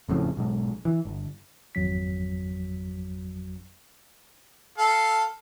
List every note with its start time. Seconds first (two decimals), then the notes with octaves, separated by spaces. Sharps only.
0.09 F#1 F2 A2 C#3
0.37 B1 G#2
0.85 E3
1.05 G1
1.75 G#1 F2 F#3 B6
4.78 A4 F5